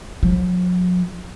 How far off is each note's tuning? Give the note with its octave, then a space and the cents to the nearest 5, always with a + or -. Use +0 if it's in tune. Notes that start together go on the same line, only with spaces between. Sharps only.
F#3 -40